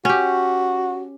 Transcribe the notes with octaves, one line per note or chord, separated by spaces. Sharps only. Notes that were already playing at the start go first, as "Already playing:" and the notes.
C#4 F#4 G4